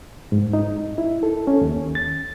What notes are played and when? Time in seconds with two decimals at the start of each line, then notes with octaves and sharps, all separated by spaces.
0.32 G#2
0.53 D#4
0.98 E4
1.23 A4
1.47 C#4
1.61 D#2
1.95 A6